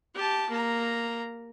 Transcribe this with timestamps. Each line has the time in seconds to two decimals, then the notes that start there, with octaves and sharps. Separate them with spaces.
0.15 G4 A5
0.49 A#3 A#5